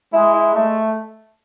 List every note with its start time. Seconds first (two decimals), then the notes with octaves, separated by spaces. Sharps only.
0.13 G#3 E4
0.34 E4
0.54 G#3 A3